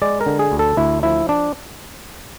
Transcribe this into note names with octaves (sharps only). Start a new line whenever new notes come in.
G#3 D5
A#4
D3
G#4
D2
A4
D2 E4
F3 E4
D4